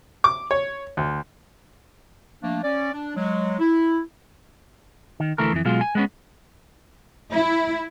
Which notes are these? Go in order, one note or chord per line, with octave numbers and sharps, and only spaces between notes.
D6
C#5
D2
F3 A3 A#3 D4
C#4 D5
D4
F#3 G#3
E4
D#3
D2 E3 A3 A#4
F2 E3
B2 F#3 G#3 F4
G#5
G#3 B3 C#4
E4